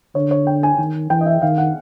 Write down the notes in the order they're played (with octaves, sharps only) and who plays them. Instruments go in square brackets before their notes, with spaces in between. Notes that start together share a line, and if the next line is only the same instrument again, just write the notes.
[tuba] D3 [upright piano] C#5
[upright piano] C#5
G5
G#5
[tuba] D#3
[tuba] E3 [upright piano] G5
[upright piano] D#5
E5
[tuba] D#3 [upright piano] F5
[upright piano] F#5